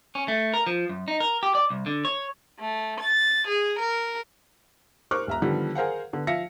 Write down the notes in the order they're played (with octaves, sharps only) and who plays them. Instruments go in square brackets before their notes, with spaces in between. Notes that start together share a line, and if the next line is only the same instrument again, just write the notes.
[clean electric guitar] C#4
A3
A#4
F3
F#2
D#4
A#4
G4
D5
C2
D3
C#5
[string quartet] A3
A6
G#4
A#4
[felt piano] A#4 C5 C#6 D6 F6 F#6
D#1 E5 A#5
D3 D#3 F3 G3 B3
G#4 A#4 C5 F5 F#5
D3 B3
F3 E5 F5 A#6 C#7